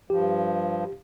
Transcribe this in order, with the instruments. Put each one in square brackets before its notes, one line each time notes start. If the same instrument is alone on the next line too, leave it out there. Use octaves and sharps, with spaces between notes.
[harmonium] G2 F3 [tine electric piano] G4